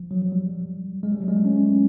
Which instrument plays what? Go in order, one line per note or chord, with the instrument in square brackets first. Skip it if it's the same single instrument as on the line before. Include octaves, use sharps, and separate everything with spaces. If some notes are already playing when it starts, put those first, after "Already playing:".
Already playing: [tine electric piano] F3
F#3
F#3
G3
G#3
G3
F#3
G#3
A3
C#4